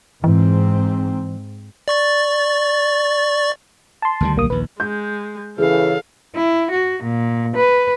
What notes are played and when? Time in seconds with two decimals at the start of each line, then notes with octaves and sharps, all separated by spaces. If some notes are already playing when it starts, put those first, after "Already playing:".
0.24 G#2 E3 C4
1.88 D5 C#6 A6
4.02 A5 C6
4.20 D2 D#3 G3
4.36 B1 A#3 D#6
4.50 A#1 D#2 B4
4.80 G#3 G6
5.58 C#3 E3 G#4 A4 F5
6.33 E4
6.71 F#4
7.02 A#2
7.55 B4